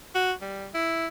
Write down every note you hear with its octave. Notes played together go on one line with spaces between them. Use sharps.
F#4
G3
E4